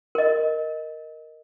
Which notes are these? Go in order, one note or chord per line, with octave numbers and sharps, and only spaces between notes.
A#4 D#5